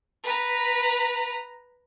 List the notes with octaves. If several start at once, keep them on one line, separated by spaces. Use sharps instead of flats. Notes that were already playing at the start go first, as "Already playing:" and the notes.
B4 A#5